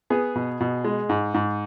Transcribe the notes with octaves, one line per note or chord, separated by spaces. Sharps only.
B3 G#4
B2
B2
G#3
G#2
G#2